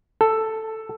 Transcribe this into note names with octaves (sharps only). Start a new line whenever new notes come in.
A4